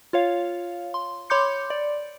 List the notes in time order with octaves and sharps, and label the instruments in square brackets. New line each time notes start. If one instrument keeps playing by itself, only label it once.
[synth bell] F4 C#5 F5
C6
C#5 B5 C6 D6 G6 C#7
D5